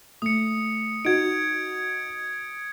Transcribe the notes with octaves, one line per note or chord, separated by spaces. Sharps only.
A3 D#6 C#7
D#4 F#4 G#6 D7